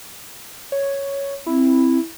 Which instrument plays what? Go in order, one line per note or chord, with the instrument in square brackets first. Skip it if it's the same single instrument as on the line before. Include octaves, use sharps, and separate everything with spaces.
[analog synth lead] C#5
[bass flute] C4 [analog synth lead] E4